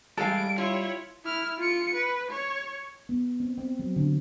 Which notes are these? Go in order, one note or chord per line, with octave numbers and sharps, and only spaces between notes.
A2 E3 G3 G#3 A4 F5 D7
E4 F4 C#5
E4 F6
F4 C#7
B4
C#5
B3
C4
C4
F#3
D3